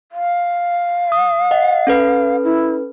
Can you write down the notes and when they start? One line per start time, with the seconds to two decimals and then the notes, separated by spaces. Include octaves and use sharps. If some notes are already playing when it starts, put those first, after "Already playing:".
0.12 F5
1.12 D#6
1.51 D#5 F#5
1.87 C#4 A4 B4
2.44 E4